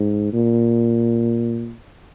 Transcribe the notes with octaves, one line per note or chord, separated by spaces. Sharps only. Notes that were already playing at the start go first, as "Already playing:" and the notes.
Already playing: G#2
A#2